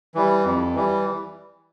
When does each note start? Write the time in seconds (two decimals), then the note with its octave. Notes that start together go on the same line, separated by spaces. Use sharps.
0.15 E3 G3
0.45 F2
0.75 E3 G3